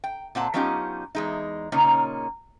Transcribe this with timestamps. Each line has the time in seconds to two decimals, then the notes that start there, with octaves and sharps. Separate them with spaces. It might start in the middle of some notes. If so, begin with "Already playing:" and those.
0.04 G5
0.35 A#2 C4 F#5 A5
0.54 F#3 B3 C#4 D#4 F4 G4
1.15 E2 G#3 D#4
1.72 A#2 C#3 A#3 C#4 D#4